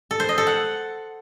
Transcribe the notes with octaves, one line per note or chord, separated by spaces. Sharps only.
A4
C5
D#5
A4
F#5